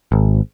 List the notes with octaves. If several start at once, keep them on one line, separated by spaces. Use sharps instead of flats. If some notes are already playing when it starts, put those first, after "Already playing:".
G#1